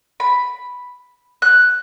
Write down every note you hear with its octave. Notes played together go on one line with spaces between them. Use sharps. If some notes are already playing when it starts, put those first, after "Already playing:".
B5
F#6